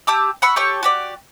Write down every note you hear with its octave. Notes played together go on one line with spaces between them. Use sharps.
G4 A5 D6 E6
F#5 B5 C#6 E6
G4 A4 C#5 C#6
F#4 G4 D5